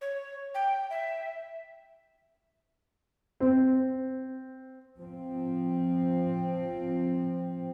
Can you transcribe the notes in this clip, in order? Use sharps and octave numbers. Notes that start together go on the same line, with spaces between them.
C#5
G5
E5
C4
F3 C4